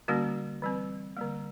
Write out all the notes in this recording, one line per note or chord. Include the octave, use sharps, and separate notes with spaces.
D3 G3 A#3 C#4 F#4
E3 G3 C4
D3 G3 A#3